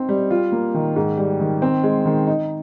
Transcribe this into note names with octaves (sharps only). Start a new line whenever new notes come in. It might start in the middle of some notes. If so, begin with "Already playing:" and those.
Already playing: C4 D#4
G3
F4
A#3
D#3
G#2
G3
D#3
C4
G#3
D#3
D#4